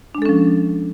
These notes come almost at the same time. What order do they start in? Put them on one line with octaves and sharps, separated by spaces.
D4 G#3 A4 C#4 F3